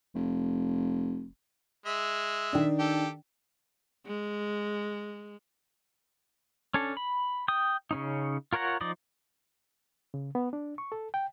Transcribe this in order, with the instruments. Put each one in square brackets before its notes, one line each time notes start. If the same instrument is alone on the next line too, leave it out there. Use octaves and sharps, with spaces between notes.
[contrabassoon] F1
[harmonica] G#3 E5
[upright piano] D#3 D4
[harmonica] G4 A4
[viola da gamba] G#3
[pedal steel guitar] C#4 D4 A4
B5
G5 D#6
C#3 C#4 D#4
F4 A#4 C#5 F#5 A#5
F3 D#4 D5 D#5
[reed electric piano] C#3
B3
D4
C#6
A4
G5